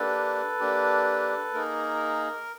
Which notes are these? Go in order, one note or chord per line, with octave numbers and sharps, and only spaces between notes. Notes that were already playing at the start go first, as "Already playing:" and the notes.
Already playing: A#3 D4 G4 A4 B4
A#3 D4 G4
A#3 D#4 G#4 A#4